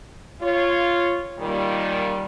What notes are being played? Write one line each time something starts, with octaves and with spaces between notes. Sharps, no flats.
F4 C#5
A#2 D#3 G3